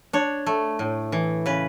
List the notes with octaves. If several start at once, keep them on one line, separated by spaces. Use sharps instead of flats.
D4 C#5
A3
A2
E3
C#3 B4